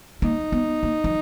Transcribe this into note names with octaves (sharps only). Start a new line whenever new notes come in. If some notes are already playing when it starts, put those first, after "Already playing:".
A#3 D#4
B3
A#3
F3